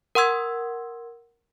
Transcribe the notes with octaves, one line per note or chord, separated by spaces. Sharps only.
A#4 F#5 C6 E6 G#6